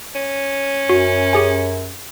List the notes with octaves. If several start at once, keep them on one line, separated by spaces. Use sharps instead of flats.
C#4
F#2 F#4
G4 G#4 G#5